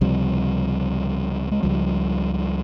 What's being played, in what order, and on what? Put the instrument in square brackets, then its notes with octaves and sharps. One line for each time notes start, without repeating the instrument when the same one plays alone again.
[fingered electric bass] C#2 C3 F3 G3
G#3
C#2 C#3 F3 G3